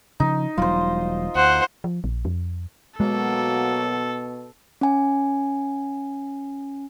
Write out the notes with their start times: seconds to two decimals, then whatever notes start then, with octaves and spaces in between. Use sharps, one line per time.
0.20 C#3 F3 D#4
0.58 E1 F#3 G3 F4 C5
1.35 D2 C5 F#5
1.84 F3
2.04 A#1
2.25 F2
3.00 B2 F#3 G#3 A#3 A4
4.81 C#4 G#5